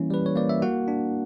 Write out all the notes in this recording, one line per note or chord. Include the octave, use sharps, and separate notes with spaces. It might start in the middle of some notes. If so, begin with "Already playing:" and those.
Already playing: E3 G3 A#3 C#4 E4
G3 B4
C#5
A#3 D5
E5
A#3 F#4 F#5
D4